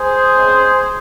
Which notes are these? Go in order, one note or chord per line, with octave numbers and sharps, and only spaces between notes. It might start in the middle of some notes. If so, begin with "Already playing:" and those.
Already playing: G#4 C5
C#3 G#3 C4